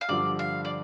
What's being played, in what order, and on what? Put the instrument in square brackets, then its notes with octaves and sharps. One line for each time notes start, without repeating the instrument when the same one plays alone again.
[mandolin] F5
[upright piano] G2 D3 F3 [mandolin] D5
[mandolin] F5
D5